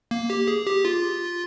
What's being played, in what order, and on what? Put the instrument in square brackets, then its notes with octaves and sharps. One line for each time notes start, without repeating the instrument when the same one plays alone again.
[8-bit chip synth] A#3
G4
G#4
G4
F4